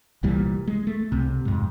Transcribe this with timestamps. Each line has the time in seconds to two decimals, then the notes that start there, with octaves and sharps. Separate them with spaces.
0.23 C2 A#2 E3 G3
0.68 G#3
0.87 A3
1.12 C2 C3
1.45 F2 G#2